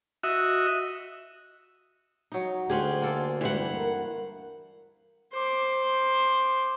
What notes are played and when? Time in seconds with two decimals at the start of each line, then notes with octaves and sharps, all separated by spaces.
0.23 F#4 D#5 E5
2.32 F#3 D#4
2.70 D2 G4 G#4 C5 F5 F#5
3.02 A#3 F4 A4
3.41 G2 E3 C5 F#5
3.76 A#4
5.33 C5 D6